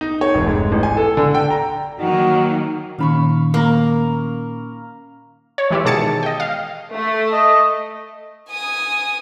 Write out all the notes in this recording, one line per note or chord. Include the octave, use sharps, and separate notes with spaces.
D#4
C#5
F1
G#2
A1
G#5
A4
D3
G5
A#5
D#3 F#3 A#3 F#4
A#2 D#3 C#4 F5 B5 C#6
A#3 F5 A#5
C#5
E3 G#3 G4 C#5 D5 E5
B2 D#3 G#4 A5 A6 C#7
D#5 G5
F5
A3
D#5
G#5 D#6